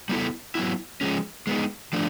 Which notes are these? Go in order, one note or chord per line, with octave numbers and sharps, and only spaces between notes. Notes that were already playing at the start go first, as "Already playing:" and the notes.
G3 B3 E4 A4
F#3 B3 E4
F3 G#3 C#4
G#3 B3 D#4
F3 A3 D4